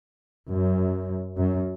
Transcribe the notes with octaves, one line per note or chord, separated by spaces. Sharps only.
F#2
F#2